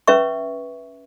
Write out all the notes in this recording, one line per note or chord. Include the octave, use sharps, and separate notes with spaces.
C#4 B4 E5 C#6